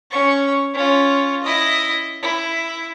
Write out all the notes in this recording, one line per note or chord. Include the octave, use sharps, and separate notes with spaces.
C#4 C#6
C#4 F4
E4 D#5
E4